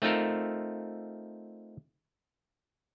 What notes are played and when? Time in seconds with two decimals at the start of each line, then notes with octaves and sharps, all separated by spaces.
0.02 A3 C4 D#4 F4 A4 A#4